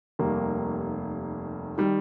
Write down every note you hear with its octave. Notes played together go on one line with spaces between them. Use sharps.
F1 D#2 D#3 G3 A#3
D#3 G3